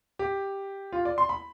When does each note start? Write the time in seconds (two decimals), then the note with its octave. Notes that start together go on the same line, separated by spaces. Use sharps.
0.19 G4
0.92 F4
1.05 D5
1.18 C6
1.29 B5